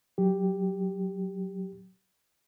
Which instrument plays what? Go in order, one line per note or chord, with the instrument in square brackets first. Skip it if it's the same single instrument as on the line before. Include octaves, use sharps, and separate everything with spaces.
[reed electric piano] F#3 G4